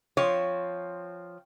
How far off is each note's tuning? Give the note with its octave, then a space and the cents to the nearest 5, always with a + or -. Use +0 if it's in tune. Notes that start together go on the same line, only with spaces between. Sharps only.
F3 +0 C4 +0 C#5 +0